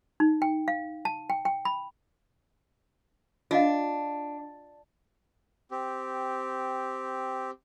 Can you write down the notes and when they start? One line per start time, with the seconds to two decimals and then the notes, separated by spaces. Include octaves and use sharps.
0.20 D#4
0.42 G5
0.68 F5
1.05 A5
1.30 G5
1.45 G5
1.65 B5
3.51 D4 F4 D#5 F5
5.71 C4 G4